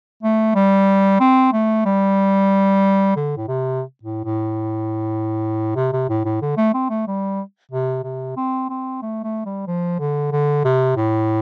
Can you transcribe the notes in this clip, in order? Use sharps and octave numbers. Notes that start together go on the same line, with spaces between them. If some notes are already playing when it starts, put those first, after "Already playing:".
A3
G3
C4
A3
G3
D3
A2
C3
A2
A2
C3
C3
A2
A2
D3
A3
C4
A3
G3
C3
C3
C4
C4
A3
A3
G3
F3
D3
D3
C3
A2